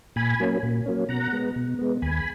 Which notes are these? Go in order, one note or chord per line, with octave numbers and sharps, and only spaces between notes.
A#2 G#5 B5
F#3 A#3 C#4
A#2
F#3 A#3 C#4
B2 F#5 A#5
G#3 B3
B2
G#3 B3
D#2 G#5 B5